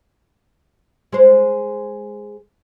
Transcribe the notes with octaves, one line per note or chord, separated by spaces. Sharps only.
G#3 G#4 C5